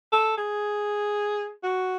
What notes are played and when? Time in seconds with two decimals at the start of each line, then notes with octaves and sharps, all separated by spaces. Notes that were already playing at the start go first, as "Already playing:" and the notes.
0.12 A4
0.38 G#4
1.63 F#4